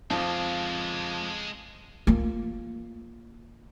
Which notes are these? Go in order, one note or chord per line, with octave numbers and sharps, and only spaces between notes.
F2 F3 G#3 F4
A#3 F4